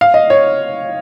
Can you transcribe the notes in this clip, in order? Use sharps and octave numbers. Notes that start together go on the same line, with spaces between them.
F5
D#5
C#5